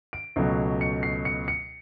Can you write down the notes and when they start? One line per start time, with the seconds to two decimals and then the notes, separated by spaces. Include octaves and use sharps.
0.13 D7
0.36 C#2 B2 F#3 A3
0.81 C#7
1.03 C7
1.25 C#7
1.48 C#7